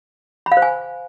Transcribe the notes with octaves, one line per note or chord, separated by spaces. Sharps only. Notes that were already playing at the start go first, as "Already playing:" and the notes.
B5
F5
C5
G#5